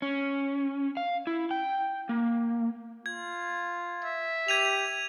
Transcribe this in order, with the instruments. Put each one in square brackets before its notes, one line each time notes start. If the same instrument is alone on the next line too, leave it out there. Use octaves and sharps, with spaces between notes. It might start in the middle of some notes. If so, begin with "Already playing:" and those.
[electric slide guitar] C#4
F5
E4
G5
A#3
[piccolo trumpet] F4 [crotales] G#6
[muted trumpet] E5
[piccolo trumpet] G4 [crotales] G#6 D#7 F7